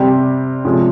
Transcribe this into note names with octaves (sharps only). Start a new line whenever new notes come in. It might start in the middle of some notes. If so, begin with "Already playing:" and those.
Already playing: C3 G3 C4 G4
C3 F3 G#3 C#4